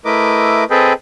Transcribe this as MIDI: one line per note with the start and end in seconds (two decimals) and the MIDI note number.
0.05 0.64 57
0.05 0.64 64
0.05 0.64 70
0.05 0.64 71
0.05 0.64 75
0.05 0.64 86
0.70 0.93 60
0.70 0.93 68
0.70 0.93 69
0.70 0.93 71
0.70 0.93 75
0.70 0.93 79